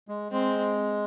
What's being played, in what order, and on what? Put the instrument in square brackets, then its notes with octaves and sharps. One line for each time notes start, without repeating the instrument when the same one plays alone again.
[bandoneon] G#3
[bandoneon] G#3 [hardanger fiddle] C4